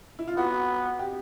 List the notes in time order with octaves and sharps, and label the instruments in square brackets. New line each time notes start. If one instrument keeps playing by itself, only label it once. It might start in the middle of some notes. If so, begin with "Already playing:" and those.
[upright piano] E4
F4
[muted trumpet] B3 [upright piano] F#4
[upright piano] G4